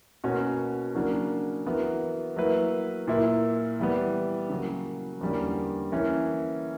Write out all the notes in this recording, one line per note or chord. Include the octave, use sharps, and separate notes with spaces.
B2 A#3 C#4 F#4
C#3 F#3 A#3 D4
E3 B3 F#4 A#4
F#3 A#3 E4 B4
A#2 A#3 E4
E3 G3 B3
C#3 F#3 A#3
E2 D3 G3 A#3 C#4
E3 A#3 C#4